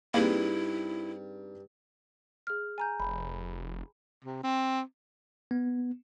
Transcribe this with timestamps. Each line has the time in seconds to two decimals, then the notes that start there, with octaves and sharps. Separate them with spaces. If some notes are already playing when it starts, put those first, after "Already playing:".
0.14 G2 A#3 C4 D#4 E4 G#4
2.47 G#4 F6
2.78 G#5 A#5 G6
3.00 F1 B5
4.24 C3
4.43 C4
5.51 B3